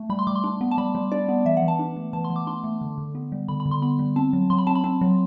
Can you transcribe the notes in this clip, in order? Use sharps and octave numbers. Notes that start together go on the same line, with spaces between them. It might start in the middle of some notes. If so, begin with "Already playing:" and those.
Already playing: A3
G3 B5
C6
G3 D6
C6
D4
B3
A5
G3 B5
G3
D4 D5
B3
E3 E5
F#5
E3
A5
D4
A3
E3 A5
C6
E3
D6
D4 C6
A3
D3
D3
B3
G3
D3 B5
B5
D3
C6
B3 B5
G3
C4 A5
F#3
F#3 C6
B5
C4 A5
B5
C4 A5
F#3